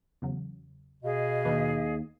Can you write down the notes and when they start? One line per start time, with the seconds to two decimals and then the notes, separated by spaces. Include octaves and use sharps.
0.22 E2 C#3 F#3
1.03 B2 G#4 D#5 F5
1.45 D#2 D#3 D4 B4